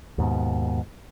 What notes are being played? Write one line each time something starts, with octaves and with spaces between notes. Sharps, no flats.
D#2 G#2 B2